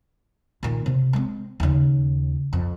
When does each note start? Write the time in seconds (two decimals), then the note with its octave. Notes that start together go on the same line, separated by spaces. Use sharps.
0.63 A#2 D#3
0.86 C3
1.13 G#3 C4
1.60 D#2 C#3
2.53 F2